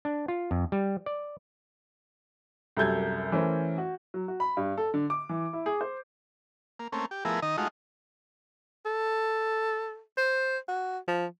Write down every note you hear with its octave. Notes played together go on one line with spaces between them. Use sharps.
D4
F4
F2
G3
D5
C2 F#2 A4 G6 G#6
E3 A3 C#4 A#4 C5
F#4
F#3
F#4
B5
G2
A4
D3
D6
E3
E4
G#4
C5
A#3
A3 A#3 C4 C#4
G4
F3 A3 B3 E4 G#4 A#4
D#3 D#4 D#5
G#3 A3 D#4 F4 F#4
A4
C5
F#4
F3